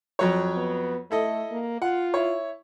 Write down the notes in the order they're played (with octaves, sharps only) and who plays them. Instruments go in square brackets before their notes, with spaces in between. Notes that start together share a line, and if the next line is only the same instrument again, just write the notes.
[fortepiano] F2 F#3 C#5
[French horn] B3
[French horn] A3 [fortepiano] E4 A4 D#5
[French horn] A#3
[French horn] F4 [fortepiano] F#5
[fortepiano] E4 C#5